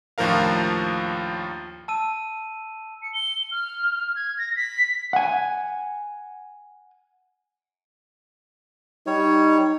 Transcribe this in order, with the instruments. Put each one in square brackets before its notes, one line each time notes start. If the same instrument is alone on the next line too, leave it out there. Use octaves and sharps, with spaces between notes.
[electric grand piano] D#2 A2 F3 D4 A#4 F5
[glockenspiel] A5 E6 D#7
[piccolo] C#7
G7
F6
G#6
A#6
B6
[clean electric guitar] F#5 G#5
[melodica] G3 C#5 [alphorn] D#4